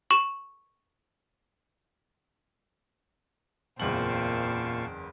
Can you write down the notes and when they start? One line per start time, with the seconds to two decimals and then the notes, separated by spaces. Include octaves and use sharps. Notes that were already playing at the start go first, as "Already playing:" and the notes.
0.11 C#6 E7
3.80 F#1 E2 A#2 C4 F5 A5 C#6 F#7